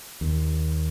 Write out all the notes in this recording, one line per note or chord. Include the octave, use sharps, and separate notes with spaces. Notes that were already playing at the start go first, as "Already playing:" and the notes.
D#2